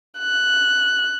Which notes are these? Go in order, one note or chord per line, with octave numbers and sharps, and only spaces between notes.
F#6